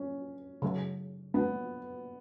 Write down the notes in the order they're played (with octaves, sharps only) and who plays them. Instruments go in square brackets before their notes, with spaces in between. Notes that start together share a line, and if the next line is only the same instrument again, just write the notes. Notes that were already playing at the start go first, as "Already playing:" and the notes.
Already playing: [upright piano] C#4
[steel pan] C#3 F#3 A3
[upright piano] B3